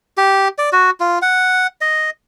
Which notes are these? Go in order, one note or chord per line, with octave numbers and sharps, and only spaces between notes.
G4
D5
F#4
F4
F#5
D#5